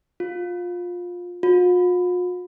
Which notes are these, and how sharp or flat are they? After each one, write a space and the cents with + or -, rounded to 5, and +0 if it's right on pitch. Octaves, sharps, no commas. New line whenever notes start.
F4 +20
F4 +45